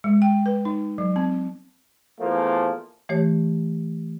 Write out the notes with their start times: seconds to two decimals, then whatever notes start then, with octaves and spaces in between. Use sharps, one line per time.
0.04 G#3
0.22 G5
0.46 B4
0.65 D#4
0.98 F#3
1.16 C4
2.19 E2 F3 A3 A#3
3.09 E3 A3 G4 C#5